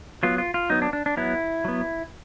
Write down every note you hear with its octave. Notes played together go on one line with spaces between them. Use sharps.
F#3 B3 F4
F4
F4
F#3 B3 D#4
D4
D4
D4
F#3 B3 E4
F#3 B3